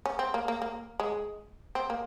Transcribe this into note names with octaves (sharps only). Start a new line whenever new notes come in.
C#4
C4
A#3
A#3
A#3
G#3
C4
A#3